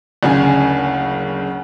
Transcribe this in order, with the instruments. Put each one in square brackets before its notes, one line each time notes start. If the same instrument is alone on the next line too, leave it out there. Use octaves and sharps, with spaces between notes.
[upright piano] F#1 D2 C#3 G#5